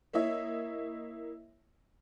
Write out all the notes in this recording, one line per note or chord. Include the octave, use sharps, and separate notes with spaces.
A#3 E4 C#5 D#5 E5